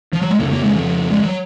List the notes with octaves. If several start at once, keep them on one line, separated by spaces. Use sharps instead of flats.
F3
F#3
G#3
F2 C#3 A#3
A#3
G#3
F3
G#3
F#3